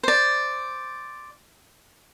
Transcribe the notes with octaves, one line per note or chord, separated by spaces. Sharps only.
C5 D5